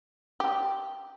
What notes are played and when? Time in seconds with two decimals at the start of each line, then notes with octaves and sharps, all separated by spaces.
0.40 G4